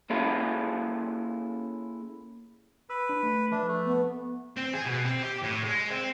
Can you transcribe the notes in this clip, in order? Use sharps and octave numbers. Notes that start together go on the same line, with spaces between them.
A#3 C#4 E4 F4 G#4 A4
B4 E6
D4
A3
F3 D4 B4 E5
A3
B3
C4
G#4
B2
C4
G4
A2
G#3
C4